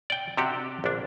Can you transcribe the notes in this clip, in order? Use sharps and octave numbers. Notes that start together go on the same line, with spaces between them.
D5 G5
C3 D4 F#4 G4
A#1 D4